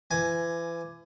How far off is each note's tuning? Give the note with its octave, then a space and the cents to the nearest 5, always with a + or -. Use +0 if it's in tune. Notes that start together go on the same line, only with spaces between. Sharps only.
E3 +35 G#5 +5